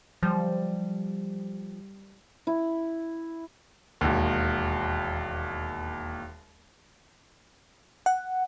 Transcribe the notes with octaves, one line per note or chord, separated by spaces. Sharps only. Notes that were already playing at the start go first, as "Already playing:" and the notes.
F3 G3
E4
E1 D#2
F#5